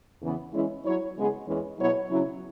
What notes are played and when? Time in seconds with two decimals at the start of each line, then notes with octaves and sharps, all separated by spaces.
0.22 E2 C#3 E3 B3
0.53 E3 G#3 C#4 E4 G#4
0.85 F#3 E4 C#5
1.15 C#3 G#3 B3 G#4 B4
1.46 E2 E3 G#3 C#4
1.79 B2 F#3 B3 E4 C#5
2.10 C#3 F#3 C#4 E4